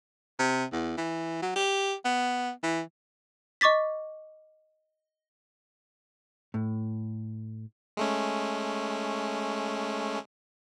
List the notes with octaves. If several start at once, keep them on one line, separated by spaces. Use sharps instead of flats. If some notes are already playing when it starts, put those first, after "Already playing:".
C3
E2
E3
F#3
G4
B3
E3
D#5 C#6 D6 A6 B6
A2
G#3 A3 C#4